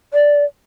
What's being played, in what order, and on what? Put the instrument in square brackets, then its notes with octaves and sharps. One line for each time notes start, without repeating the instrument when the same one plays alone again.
[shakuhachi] D5